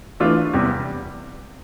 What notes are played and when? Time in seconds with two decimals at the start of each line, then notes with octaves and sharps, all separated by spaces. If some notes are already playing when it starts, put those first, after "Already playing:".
0.20 E3 A3 D4 F4
0.53 E2 C3 G3